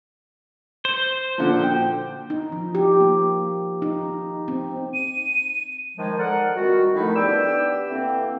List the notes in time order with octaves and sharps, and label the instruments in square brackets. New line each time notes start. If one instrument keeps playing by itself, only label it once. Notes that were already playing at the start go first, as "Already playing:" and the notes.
[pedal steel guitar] C5
[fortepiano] A#2 D3 F3
G5
[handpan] D#4
F3
G4
A#3
D#4
C4
[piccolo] D#7
[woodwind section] D#3 F3 G#3
A4 A#4 D5 F#5
A#2 D#3 G3 C4 F#4
D3 D#3 F3 A3 D#4 E4
B3 D4 G4 G5 E6
D3 E3 A#3 C4